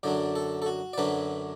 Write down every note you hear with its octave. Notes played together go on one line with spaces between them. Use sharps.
F#2 D3 F#3 D4 D5
A4
A4
F#4
D5
F#2 D3 F#3 D4 B4